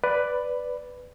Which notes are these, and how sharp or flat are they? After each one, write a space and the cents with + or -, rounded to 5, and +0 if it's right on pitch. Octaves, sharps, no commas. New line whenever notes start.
B4 +5 D5 +0